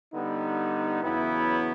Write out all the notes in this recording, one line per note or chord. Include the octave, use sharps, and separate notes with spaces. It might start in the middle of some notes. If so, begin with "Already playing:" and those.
D3 G3 B3 D#4
E2 C#3 F#3 B3 E4